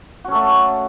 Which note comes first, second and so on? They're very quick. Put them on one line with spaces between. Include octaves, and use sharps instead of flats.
F#4 C#4 A4 A3